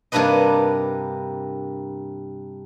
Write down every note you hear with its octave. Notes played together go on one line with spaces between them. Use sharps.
G2 C3 A#3 D4 B4 D#5